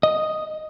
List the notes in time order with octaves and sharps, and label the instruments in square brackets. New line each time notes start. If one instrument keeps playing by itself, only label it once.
[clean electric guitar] D#5